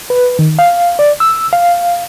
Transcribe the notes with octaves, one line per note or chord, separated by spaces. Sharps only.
B4
D#3
F5
D5
E6
F5